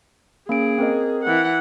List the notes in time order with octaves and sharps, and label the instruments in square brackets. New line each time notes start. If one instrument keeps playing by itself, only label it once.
[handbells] A#3 C#4 D7 [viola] G#4
[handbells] C4 A#4 D#5
[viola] E3 F#5